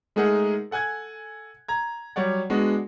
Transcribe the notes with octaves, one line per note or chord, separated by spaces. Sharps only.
G#3 A3 D#4 G#4 A#4 F#5
A4 F#5 G#5 F#6 G#6
A#5 G#6
F#3 G3 C#5 D5 F#5
G#3 B3 D4 F#4